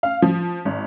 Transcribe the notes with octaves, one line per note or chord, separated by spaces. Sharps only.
F5
F3
G#1